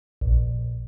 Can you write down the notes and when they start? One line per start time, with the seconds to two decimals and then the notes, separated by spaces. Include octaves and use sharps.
0.21 A#1